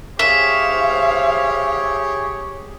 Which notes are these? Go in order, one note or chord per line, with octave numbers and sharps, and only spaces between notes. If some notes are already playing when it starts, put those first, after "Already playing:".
G4 G#4 C5 C#5 E5 F5